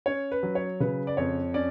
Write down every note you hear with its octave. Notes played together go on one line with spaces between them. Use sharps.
C#4 C#5
B4
F#3
C#5
C#3 B4
D5
F2 C#5
C#4 D5